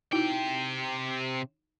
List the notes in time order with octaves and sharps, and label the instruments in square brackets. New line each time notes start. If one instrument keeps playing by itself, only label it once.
[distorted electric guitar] C3 G5 [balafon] D#4 E4 F#4